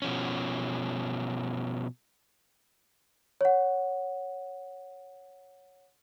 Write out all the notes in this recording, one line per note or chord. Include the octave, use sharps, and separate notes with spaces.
B2 F3 C#4
C#5 F#5